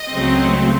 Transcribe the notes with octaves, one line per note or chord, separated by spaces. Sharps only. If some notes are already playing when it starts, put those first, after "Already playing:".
Already playing: D#5
C#2 C#3 F#3 A3 C4